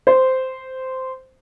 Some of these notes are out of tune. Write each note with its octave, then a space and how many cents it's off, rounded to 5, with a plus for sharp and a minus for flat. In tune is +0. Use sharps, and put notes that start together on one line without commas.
C5 -10